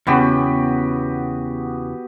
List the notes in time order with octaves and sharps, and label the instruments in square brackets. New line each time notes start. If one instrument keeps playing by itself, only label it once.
[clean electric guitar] E2 C#3 [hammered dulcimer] B3 F#4 G4